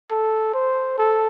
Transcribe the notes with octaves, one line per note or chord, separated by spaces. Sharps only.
A4
C5
A4